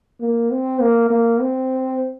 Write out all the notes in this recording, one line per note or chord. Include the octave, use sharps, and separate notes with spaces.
A#3
C4
A#3
A#3
C4